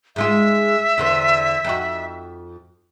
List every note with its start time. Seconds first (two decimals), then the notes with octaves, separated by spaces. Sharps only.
0.16 G#2 G#3 F4 E5
0.98 E2 D3 C4
1.65 F2 D#4 F#4